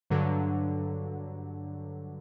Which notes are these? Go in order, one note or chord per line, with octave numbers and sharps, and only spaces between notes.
G2 D3 F#3